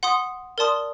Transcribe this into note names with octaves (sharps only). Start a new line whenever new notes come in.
F#5 C6 D#6
A#4 D5 A5 C6 D#6